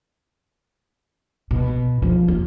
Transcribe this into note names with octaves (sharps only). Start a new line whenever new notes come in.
B2
F3
D#2